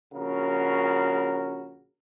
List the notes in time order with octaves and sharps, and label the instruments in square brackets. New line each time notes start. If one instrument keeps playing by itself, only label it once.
[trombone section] A#1 C#3 F#4 A#4